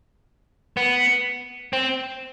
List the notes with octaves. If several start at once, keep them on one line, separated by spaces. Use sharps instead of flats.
B3
C4